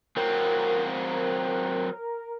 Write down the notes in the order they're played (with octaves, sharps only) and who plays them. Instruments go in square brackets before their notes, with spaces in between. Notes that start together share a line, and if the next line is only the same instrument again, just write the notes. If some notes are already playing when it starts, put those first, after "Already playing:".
[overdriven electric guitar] F#3 C4 [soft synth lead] A#4